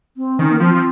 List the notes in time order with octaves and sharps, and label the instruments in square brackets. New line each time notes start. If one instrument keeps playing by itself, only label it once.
[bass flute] C4
[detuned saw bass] D#3 [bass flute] C#4
[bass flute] A#3
[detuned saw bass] F3 [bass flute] C4
[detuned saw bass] F3